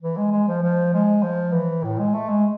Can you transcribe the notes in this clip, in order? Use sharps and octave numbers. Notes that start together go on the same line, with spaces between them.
E3
G#3
G#3
F3
F3
G#3
F3
E3
A2
G#3
A3
G#3